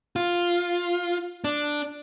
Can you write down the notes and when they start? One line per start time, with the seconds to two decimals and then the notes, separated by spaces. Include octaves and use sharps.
0.16 F4
1.44 D4